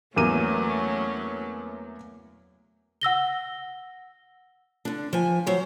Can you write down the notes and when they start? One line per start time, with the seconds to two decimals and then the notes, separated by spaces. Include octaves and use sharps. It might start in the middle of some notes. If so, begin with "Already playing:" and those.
0.16 E2 F#3 A3 A#3 C#4 D#7
3.01 F#5 E6 A#6 G7
4.85 D3 D4
5.13 F3 G#5
5.46 F#3 C5